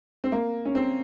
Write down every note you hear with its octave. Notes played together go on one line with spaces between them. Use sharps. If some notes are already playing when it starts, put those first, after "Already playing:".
C4
A#3
C#4
C4